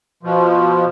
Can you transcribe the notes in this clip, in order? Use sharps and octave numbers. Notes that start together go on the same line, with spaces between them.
B2 F3